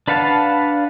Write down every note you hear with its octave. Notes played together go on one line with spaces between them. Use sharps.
D4 B4 F5 F#5 A5